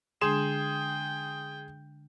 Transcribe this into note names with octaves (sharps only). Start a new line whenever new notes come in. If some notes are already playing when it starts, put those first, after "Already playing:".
D3 G#3 D4 G#4 G5 C6 E7